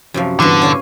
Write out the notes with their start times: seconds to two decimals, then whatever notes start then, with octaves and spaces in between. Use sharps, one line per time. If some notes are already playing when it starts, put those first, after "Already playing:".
0.14 F#2 C3 F3
0.40 E2 G2 D3
0.62 C#4 F5 G#5